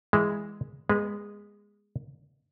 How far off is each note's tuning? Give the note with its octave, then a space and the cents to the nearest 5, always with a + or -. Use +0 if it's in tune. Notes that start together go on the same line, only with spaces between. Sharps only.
E3 +0 G#3 -10 E5 +0
G#3 -15 B3 -40 B4 +0